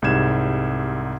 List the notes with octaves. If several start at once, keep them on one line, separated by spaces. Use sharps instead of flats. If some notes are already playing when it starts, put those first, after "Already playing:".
C2 G#2 G3 G#6 E7